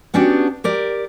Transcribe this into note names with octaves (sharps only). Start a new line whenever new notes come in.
B3 C#4 D4 F#4 G4
G4 A#4 D5